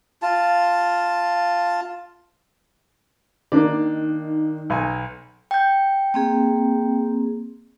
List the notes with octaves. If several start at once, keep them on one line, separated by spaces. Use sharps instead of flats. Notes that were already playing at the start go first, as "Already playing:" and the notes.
F4 A5
D#3 A#3 D4 D5
B1 G#5
G5 G6
A#3 C4 G#4